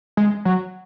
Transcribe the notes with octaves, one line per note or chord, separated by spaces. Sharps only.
G#3
F#3